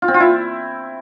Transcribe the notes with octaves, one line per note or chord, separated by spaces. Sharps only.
F4
C4
F4
E4